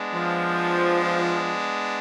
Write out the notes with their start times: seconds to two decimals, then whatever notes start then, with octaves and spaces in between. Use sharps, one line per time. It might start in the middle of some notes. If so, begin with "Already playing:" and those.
Already playing: G#3 B3 D4
0.14 F3